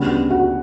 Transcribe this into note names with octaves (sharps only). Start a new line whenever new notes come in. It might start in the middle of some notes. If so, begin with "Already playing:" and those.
Already playing: D2 C#3 G3 B3 F#4
F#4